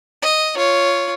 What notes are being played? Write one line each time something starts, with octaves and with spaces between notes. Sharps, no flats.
D#5
F4 C#5